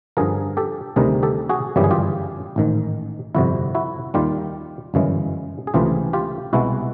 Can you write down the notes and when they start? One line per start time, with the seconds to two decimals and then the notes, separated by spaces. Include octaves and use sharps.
0.17 G2 D3 F3 G#4 A#4
0.57 G4 A4
0.96 D2 C3 D#3 G3 G#4 A#4
1.23 G4 A4
1.49 F#4 G#4
1.76 G1 F#2 C#3 E3 G3 G4
1.84 G#4
1.91 F4 G4
2.56 A1 G#2 D#3
3.35 G1 F2 C3 E4 F#4
3.75 E4 F#4
4.14 D#2 D#3 G3 F4 G4
4.94 G1 F#2 C#3 E3 G#3
5.67 G#4
5.74 C#2 C3 E3 A3 F4 G4
6.13 F4 G4
6.53 C2 B2 G#3 E4 F#4